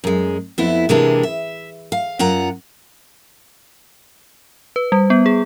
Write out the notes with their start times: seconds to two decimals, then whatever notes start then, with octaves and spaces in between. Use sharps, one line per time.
0.04 F#2 G#3
0.58 F2 B3 E4
0.89 C3 E3 G#3 A#3 D4
1.23 E5
1.92 F5
2.19 F#2 F4 F#5 A#5
4.76 B4
4.92 G3
5.10 B3
5.26 G#4